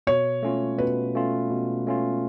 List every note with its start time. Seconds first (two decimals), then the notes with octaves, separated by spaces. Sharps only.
0.07 B2 C#5
0.43 A3 C#4 F4
0.78 B2 B4
1.15 A3 C#4 F4
1.50 B2
1.87 A3 C#4 F4